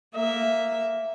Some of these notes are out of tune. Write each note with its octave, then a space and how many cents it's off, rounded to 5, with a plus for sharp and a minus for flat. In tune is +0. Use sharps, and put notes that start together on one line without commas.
A#3 +0 E5 +0